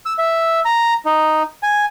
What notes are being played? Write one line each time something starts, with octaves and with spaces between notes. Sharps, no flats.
E6
E5
A#5
D#4
G#5